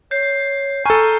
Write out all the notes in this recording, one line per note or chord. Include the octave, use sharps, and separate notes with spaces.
C#5 G6 C7
A4 G#5 A#5 C#6 F6 D#7